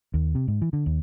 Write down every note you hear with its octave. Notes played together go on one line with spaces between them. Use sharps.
D#2
C3
G#2
E3
D3
D#2